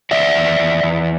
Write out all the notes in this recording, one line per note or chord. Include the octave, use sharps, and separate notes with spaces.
E2 D5 E5
E2
E2
E2